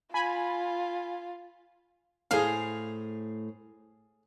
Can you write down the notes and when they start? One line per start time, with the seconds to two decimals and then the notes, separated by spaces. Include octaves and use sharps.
0.14 F4 G#5 B5
2.31 A2 G#4 C5 F5 A#5